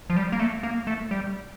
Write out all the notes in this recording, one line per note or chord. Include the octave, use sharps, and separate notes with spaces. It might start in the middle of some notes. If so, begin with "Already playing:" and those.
F3
G3
A#3
A3
A#3
A3
G3